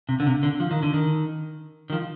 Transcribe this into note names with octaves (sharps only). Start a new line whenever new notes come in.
C3
D3
C3
D3
F3
D#3
D3
D#3
D#3
F3